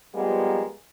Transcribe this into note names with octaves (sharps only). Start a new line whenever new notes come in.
F3 G3 G#3 A#3 B3